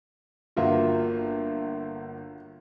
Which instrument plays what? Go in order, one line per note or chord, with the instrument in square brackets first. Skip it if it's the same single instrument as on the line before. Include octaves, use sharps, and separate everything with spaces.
[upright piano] G1 A#3 F#4 [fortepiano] F4 E5